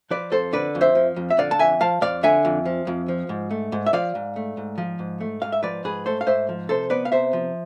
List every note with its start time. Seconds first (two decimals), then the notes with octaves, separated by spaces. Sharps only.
0.11 F3 B4 D5
0.31 F2 A4 C5
0.53 D3 B4 D5
0.75 F2
0.81 C5 E5
0.95 F3
1.16 F2
1.30 E5
1.38 D3 D5 F5
1.51 A5
1.59 F2 E5 G#5
1.81 F3 F5 A5
2.01 F2 D5 F5
2.23 D3 E5 G#5
2.45 F2
2.65 F3
2.87 F2
3.08 F3
3.29 G#2
3.51 A3
3.72 G#2
3.86 E5
3.93 F3 D5 F5
4.15 G#2
4.36 A3
4.57 G#2
4.78 F3
4.99 G#2
5.21 A3
5.42 G#2 F5
5.52 E5
5.63 F3 B4 D5
5.84 G#2 G#4 B4
6.06 A3 A4 C5
6.21 F5
6.26 G#2 C5 E5
6.49 F3
6.69 C3 A4 C5
6.90 B3 B4 D5
7.05 F5
7.12 C3 C5 E5
7.33 F3